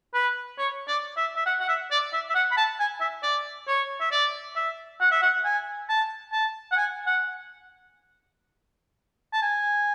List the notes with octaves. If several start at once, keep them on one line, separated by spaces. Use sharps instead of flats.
B4
C#5
D5
E5
E5
F#5
F#5
E5
D5
E5
E5
F#5
B5
A5
G#5
E5
D5
C#5
E5
D5
E5
F#5
E5
F#5
G#5
A5
A5
F#5
G#5
F#5
A5
G#5